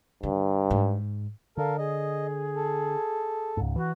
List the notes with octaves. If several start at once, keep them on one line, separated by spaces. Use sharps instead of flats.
G2 D3
G#2
D3 A4 A#4 F5
G#4 D#5
A4
C#2 G#2
E3 F#4